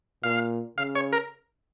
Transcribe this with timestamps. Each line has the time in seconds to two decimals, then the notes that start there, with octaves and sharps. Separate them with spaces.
0.23 A#2 F5
0.77 C#3 F5
0.95 C#5
1.13 A#4